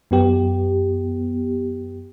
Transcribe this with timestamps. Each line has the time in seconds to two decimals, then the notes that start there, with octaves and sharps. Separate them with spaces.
0.11 F#2 B3 G4